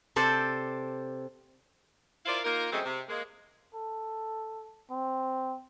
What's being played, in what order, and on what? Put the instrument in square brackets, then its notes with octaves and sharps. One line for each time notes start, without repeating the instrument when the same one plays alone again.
[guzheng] C3 A4 C5 D5
[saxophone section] E4 F4 A#4 C5 D5 F5
A#3 D#4 F4 A#4
C#3 F#3 G#3 A3 C4
C3
G#3 A#3
[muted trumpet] A4
C4